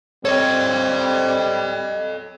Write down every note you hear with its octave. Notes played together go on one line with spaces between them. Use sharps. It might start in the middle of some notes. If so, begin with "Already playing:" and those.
G3 C4 A4 C#5 D#5